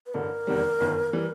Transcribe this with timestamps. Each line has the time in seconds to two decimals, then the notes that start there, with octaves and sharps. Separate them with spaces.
0.06 B4
0.14 A1 G2 D3 A#4
0.47 F1 E2 C3 D#3 G3
0.80 G1 F#2 D#3
1.13 E3 G3